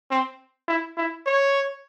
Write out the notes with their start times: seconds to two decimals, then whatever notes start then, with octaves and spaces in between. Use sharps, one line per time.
0.11 C4
0.68 E4
0.97 E4
1.26 C#5